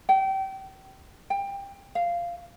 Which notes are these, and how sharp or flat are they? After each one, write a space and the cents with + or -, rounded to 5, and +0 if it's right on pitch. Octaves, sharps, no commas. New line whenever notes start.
G5 -30
G5 +20
F5 -10